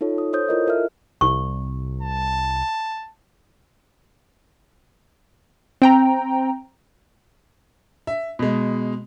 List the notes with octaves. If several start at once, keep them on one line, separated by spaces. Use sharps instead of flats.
D#4 F4 A4 C#5
D#6
A4 C5 C#5 D#6 G6
E4 F4 A#4 D#5
A4 A#4 E5 F6
C2 C#6
A5
C4 G5 A#5
E5
B2 G#3